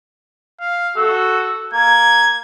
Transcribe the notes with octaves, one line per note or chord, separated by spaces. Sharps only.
F5
F#4 A4
A#3 G#6